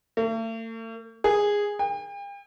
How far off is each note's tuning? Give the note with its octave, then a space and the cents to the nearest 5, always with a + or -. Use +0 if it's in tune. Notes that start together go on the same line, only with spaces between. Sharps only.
A3 +45
G#4 -10
G5 +40